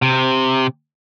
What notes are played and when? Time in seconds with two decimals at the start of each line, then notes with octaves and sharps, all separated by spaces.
0.02 C3